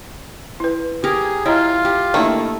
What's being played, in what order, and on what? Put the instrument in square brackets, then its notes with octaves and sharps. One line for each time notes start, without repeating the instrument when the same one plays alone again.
[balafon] E4 B4
[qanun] G4 A#4 A#5 [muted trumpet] G#4
[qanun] E4 G5 [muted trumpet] F4 [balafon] C#5 D#5 A#5
[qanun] G4
[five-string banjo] D#3 E4 [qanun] A3 [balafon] A#3 D4